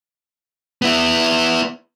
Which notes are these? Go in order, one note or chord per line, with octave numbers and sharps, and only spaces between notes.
B3 E4